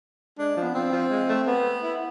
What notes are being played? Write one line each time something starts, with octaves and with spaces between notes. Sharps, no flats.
G#3 D4
F3
B3
F3 C4
F3
G#3
A3
B3
E4